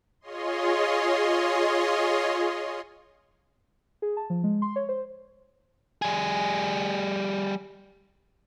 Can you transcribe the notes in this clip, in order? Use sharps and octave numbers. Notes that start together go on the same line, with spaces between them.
F4 G#4 C#5 D#5 C6
G#4
A5
F3
G#3
C6
C#5
C5
G3 G#4